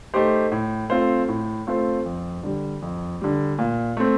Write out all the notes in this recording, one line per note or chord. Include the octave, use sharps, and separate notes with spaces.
A3 D#4 G4 C5
A2
A3 C4 F4 C5
A2
A3 C4 F4 C5
F2
D3 G3
F2
D3 G3
A#2
A3 C4